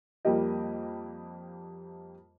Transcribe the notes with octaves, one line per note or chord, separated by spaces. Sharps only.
F2 G3 A#3 G4 D#5